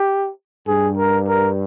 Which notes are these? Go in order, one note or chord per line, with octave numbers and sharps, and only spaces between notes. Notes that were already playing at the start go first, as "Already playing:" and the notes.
Already playing: G4
G2 G#4
A#4
A#4